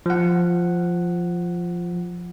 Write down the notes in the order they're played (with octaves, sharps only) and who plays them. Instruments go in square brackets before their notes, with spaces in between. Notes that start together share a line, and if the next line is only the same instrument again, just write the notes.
[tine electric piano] F3 F#5